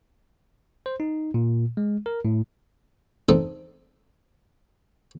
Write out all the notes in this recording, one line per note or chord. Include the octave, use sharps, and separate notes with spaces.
C5
D#4
A#2
G#3
A#4
A2
C4 D4 D#4 A4